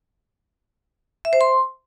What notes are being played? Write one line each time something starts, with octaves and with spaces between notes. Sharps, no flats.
E5
C5
C6